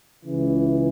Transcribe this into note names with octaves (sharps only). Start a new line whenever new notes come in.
C#2 C#3 E3